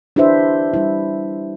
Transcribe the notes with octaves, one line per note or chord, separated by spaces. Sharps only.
D4 E4 G4 B4 C5 E5
G3 E4